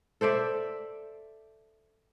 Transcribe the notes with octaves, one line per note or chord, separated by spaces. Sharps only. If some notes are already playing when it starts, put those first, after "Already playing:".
A4 C5 D5 E5